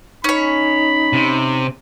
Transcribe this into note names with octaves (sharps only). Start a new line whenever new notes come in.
C#4 D#4 C#5 B5
C3